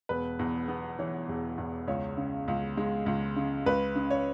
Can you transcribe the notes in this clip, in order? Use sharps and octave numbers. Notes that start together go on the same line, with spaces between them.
E1 B4
E2
B3
E3 C#5
E1
E2
C#2 C#5
C#3
C#2
G#3
C#2
C#3
C#2 B4
C#3
C#5